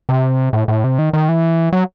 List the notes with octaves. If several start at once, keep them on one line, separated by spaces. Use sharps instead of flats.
C3
A2
A2
C3
D#3
D#3
E3
F#3